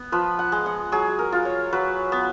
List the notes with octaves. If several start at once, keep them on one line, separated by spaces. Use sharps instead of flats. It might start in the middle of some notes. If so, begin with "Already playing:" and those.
Already playing: B3
F3 B4
F#5
G#3
F#5
F#3 G#4
A#4
F4
C#5
F#3 B4
B3